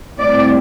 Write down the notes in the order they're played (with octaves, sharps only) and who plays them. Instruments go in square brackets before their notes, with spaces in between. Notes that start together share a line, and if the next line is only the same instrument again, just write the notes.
[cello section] A2 G3 C4 E4 D5